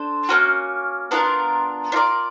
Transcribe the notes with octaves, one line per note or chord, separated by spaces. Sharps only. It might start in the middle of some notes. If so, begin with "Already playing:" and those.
Already playing: D4 A4 C5
A#3 C#4 F#4
B3 D4 F4 A#4
D4 F4 A#4 D5